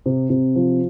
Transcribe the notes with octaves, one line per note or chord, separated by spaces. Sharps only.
C3
C3
F3